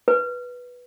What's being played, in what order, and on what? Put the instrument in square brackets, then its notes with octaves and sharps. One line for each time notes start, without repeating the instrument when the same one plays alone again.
[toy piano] B4